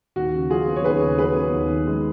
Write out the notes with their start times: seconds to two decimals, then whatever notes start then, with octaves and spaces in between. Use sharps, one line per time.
0.16 D#2 F#4
0.34 C#3
0.50 F#3 F4 G#4
0.68 B3
0.76 C#5
0.84 D#2 G#4 B4
1.01 C#3
1.18 F#3 G#4 B4
1.35 B3
1.52 D#2
1.69 D#3
1.87 G#3